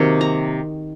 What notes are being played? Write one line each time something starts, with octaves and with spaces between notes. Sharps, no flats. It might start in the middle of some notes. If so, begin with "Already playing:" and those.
Already playing: C3 D#3 F#3 A#3
A#5